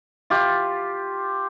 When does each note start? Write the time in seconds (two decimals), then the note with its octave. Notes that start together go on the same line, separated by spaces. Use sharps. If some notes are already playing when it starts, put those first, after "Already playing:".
0.30 F4 G4